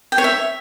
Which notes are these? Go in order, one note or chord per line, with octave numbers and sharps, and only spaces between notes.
G5
C#5
E5